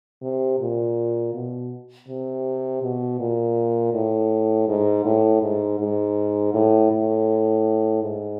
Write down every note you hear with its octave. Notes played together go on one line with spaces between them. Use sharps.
C3
A#2
B2
C3
B2
A#2
A2
G#2
A2
G#2
G#2
A2
A2
G#2